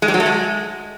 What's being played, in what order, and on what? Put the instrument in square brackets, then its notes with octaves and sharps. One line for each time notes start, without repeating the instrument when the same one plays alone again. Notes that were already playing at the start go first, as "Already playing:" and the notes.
[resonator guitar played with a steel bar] G#3
G3
F#3
A3
G#3